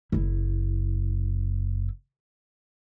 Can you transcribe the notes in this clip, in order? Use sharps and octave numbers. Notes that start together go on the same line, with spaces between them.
F#1 E4